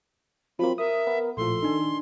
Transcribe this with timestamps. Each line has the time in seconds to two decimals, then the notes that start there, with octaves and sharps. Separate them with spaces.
0.59 F3 F#3 A#3 C4 B5
0.78 A#4 E5 D#6
1.07 B3
1.37 A#1 A2 F3 A4 C6
1.63 D#3 D4 D#4